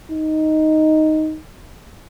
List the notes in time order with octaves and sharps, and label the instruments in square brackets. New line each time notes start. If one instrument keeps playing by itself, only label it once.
[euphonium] D#4